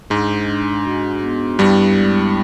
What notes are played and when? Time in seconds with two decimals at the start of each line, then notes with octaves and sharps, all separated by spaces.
0.10 G#2 G#3 D4
0.48 D4
0.85 F#4
1.22 B3
1.59 G2 G3 E4
1.96 G#3